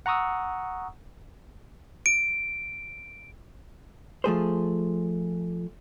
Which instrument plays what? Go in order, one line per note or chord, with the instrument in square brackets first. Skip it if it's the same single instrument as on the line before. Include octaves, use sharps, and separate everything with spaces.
[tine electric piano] F#5 A#5 C#6 D#6 E6
[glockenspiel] D7
[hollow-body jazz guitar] F3 A3 G#4 C5